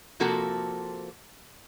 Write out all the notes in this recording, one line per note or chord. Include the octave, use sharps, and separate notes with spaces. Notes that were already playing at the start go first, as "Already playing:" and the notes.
C3 F3 A#3 F#4 A4